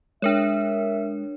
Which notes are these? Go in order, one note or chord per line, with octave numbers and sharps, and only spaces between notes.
G#3 D4 A#4 C#5 E5